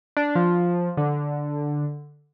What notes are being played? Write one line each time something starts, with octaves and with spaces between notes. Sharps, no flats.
D4
F3
D3